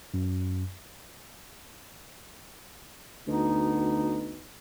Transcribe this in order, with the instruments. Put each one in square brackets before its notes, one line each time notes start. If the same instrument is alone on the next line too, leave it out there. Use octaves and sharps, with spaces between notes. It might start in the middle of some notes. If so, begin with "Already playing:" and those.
[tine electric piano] F#2
[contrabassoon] D2 [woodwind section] B2 B3 D#4